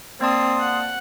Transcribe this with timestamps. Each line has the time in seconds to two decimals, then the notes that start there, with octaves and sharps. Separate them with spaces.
0.21 A#3 C4 D5 A5 C6 D#6
0.60 F#5